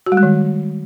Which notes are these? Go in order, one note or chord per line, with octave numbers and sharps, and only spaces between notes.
F#4
G3
G#3
D#3